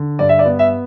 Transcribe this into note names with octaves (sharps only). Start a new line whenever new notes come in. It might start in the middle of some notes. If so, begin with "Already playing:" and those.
Already playing: D3
G2 D5
E5
D5
B3
E5